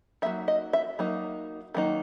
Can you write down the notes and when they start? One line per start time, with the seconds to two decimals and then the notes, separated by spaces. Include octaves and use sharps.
0.22 F#3 A#3 D#4 E5
0.48 D#5
0.73 E5
0.99 F#3 A#3 D#4
1.74 D#3 F#3 A#3 D#4